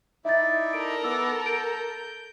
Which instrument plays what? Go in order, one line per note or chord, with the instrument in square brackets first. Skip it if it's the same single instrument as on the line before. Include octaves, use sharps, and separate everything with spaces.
[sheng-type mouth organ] D#4 E4 D5 [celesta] E5 A6
[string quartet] A4 A#4 [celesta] D7
[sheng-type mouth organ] B3 D6 [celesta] E6
[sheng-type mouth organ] G6 [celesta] D7